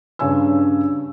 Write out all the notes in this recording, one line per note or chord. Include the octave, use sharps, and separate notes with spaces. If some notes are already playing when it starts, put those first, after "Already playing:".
G2 C#3 D4 C#5 G#5 E6